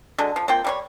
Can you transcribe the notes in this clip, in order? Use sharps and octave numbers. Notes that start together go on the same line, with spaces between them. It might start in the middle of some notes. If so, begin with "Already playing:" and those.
D3 F#3 G#3
F3
A#3 C4 F4 G5
G3 D4 C#5